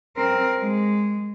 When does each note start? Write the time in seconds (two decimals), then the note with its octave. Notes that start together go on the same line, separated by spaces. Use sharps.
0.17 C4 A#4
0.59 G#3